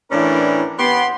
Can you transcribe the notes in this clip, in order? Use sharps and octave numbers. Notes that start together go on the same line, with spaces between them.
A2 E3 C#4 D4 A#4 D5
B3 G4 C6